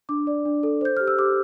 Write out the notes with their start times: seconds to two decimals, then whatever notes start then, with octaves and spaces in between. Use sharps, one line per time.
0.09 D4 D6
0.27 D5
0.45 D4
0.63 A4
0.81 C5 G6
0.97 G4 F6
1.08 E6
1.18 G4 D6